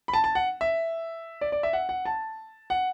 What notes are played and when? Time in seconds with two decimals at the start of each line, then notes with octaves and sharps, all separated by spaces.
0.08 B5
0.13 A5
0.24 A5
0.35 F#5
0.61 E5
1.41 D5
1.52 D5
1.63 E5
1.73 F#5
1.89 F#5
2.05 A5
2.70 F#5